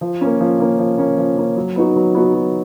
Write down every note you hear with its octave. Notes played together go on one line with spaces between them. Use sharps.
F3
A#3 C#4
F3
A#3 C#4
F3
A#3 C#4
F3
A#3 C#4
F#3
B3 D#4 F#4
F#3
B3 D#4 F#4
F#3